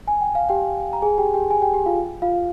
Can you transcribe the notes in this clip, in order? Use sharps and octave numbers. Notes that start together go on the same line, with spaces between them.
G#5
G5
F5
G4 G5
A#5
G#4 G#5
G4 G5
G4 G5
G#4 G#5
G4 G5
G4 G5
F4 F5
F4 F5